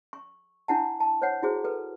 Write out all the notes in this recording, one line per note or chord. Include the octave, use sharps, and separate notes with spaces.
C#6
D4 E4 F#5 A5
A5
C5 C#5 F#5
E4 F#4 G#4 C5
A4 B4